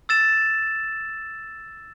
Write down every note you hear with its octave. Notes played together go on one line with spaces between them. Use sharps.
E6 A6 E7